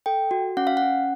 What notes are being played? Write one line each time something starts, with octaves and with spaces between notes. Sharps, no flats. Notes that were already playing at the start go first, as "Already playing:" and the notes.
A4 G5
F#4
C#4 F#5
F5
F#5
C#4